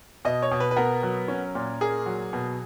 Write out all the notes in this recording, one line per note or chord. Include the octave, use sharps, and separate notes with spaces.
B2 D#5
C#5
B2
B4
B4
B3 A#4
F#3
C#4
A#2
A#3 G#4
F#3
B2